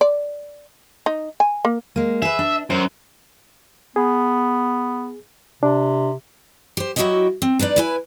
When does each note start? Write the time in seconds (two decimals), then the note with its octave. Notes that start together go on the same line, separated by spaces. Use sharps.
0.01 D5
1.06 D#4
1.40 G#5
1.65 A#3
1.96 G#3 A#3
2.22 G#4 B4 E5
2.39 D4
2.70 F#2 C5
3.96 B3 G#4
5.63 C3 D4
6.77 G4 C5
6.96 F#3 E4 F#4 G4 D#5 E5
7.42 C4
7.59 D4 D#4 B4 D5
7.76 E4 B4 G#5